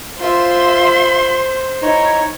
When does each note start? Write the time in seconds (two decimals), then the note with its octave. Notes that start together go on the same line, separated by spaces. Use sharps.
0.19 F4 C5 E5 C6
1.82 D#4 E4 C#5